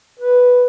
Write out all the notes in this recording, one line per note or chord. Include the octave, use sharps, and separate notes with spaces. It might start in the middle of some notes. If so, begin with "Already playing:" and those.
B4